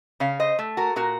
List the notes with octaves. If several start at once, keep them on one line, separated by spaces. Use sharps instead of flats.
C#3 C#5 F5
C5 D#5
A3
F#4 A#4
A#2 F#4 A#4